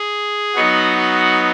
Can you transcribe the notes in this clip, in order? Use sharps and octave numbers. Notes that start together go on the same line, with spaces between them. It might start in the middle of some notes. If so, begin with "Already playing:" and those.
Already playing: G#4
F#3 B3 D#4 F#4
F#4